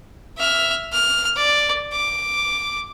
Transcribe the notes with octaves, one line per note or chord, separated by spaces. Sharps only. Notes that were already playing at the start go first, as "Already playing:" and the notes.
E5 F6
F6
D5
D6